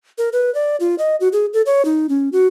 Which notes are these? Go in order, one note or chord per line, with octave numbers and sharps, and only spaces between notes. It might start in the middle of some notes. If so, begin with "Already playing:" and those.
A#4
B4
D5
F4
D#5
F#4
G#4
A4
C#5
D#4
C#4
F#4